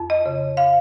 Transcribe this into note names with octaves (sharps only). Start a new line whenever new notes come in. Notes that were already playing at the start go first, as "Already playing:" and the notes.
Already playing: F2
D#5
C#3
F5